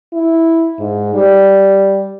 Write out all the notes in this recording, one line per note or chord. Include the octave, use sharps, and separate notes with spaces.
E4
G#2
G3